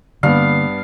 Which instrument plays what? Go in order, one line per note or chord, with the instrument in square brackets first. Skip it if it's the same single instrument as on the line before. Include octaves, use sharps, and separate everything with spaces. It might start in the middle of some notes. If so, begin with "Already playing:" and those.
[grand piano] G2 B3 [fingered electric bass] D3 A#3 [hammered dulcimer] F5